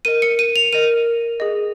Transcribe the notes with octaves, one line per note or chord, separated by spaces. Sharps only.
A#4 D#5 D#7
C#7
D#7
F7
A#4 D#5 D#7
G#4 D#5